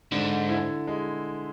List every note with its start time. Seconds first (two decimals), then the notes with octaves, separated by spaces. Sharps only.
0.12 G#2 D3
0.49 E4
0.87 G#3